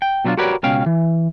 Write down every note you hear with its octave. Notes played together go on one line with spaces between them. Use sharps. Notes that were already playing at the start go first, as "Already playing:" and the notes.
G5
B2 F#3 G3 D4 F4
F#4 G4 A#4 B4 C#5 D5
C#2 B2 C#4 F5 G5
E3